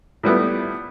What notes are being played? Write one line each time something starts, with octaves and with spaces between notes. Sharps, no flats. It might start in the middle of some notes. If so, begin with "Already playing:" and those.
A2 G3 B3 E4